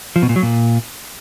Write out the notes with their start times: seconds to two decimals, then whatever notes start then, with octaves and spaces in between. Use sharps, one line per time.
0.16 F3
0.22 B2
0.29 A#2
0.36 F#3
0.43 A#2